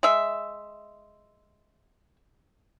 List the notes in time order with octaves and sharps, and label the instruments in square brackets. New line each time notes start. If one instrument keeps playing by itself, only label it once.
[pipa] G#3 E5